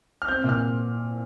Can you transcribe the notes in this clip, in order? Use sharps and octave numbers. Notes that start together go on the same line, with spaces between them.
F6
C4 G6
A#2
F6